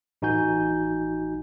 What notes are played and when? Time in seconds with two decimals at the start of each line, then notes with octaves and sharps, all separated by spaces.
0.22 A1 D#4 F#4 G#5 G6